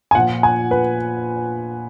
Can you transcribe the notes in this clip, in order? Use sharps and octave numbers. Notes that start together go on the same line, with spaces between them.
G#5
A#2 F3 F#5
G#5
B4